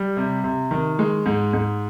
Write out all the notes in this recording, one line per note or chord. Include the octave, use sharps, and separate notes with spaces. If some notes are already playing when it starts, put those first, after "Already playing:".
Already playing: G3
C3
C3
D#3
G#3
G#2
G#2